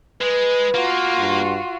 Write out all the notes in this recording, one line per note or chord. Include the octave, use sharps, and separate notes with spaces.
G#3 G#4 B4
A#3 F4 F#4
G2